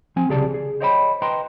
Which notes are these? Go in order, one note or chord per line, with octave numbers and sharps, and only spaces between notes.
F3 C4 G#5
C2 C#3 G4 G#4 D5 A5
G#4
C5 C#5 D#5 G5 G#5 B5
B4 D#5 G5 A#5 C6